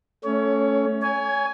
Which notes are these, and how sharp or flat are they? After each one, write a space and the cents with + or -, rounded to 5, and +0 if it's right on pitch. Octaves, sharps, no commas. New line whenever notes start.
A3 -5 C#4 +0 C#5 +25
C#5 +25 G#5 +0